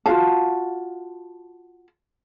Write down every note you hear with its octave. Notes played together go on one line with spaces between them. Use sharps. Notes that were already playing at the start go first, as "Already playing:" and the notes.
F4 F#4 F5 A5